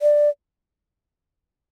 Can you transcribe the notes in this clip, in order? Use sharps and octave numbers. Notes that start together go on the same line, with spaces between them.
D5